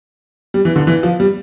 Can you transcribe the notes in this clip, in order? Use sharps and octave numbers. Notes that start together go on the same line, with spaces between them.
G3
E3
D3
E3
F3
G3